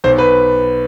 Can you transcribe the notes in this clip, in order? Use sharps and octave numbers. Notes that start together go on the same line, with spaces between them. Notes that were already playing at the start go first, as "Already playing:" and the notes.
B1 C5
B4